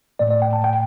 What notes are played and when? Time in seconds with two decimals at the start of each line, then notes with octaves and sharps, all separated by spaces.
0.19 A2 A3 D5
0.30 D5
0.42 G5
0.53 A5
0.64 G5